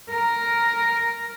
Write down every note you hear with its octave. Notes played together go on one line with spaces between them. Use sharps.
A#4